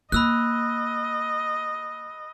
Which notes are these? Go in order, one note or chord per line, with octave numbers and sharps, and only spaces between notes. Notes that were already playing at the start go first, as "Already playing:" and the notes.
A#3 D#5 B5 E6 F#6